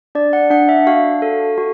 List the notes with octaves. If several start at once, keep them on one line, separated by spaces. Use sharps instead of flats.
D4 D5
F#5
D4 F#5
E5
F#4 F5
A4
F#4